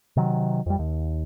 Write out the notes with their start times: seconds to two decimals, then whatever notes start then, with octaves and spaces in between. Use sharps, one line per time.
0.17 C3 D#3 F#3
0.66 F2 G3
0.79 D#2